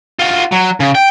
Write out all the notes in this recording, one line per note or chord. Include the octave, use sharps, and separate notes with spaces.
F4 F#4
F#3
C#3
G5